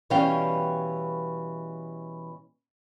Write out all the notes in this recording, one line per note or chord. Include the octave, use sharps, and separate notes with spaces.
B2 E3 G3 C#4 F5 G5